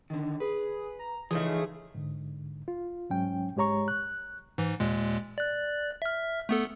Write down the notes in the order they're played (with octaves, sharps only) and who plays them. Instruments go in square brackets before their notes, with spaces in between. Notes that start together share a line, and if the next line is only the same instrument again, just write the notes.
[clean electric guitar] D3 D#3
[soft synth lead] G#4 [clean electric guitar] B4
[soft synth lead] A#5
[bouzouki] C#3 A3 G#4 [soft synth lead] E3 [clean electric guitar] F3 D#4
[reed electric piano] G#2 D3
F4
C2 G#2 F#3 C#4 G5
G#2 G#3 G4 C#5 A#5 C#6
F#6
[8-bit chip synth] G#2 E3
D#2 A#2 G#3
D5 F#6
E5 F6
A3 B3 A4